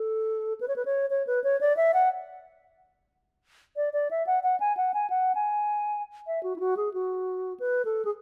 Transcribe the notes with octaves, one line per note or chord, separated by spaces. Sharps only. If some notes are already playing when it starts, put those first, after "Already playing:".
Already playing: A4
B4
C#5
B4
C#5
C#5
B4
C#5
D5
E5
F#5
D5
D5
E5
F#5
F#5
G#5
F#5
G#5
F#5
G#5
E5
F#4
E4
F#4
G#4
F#4
B4
A4
G#4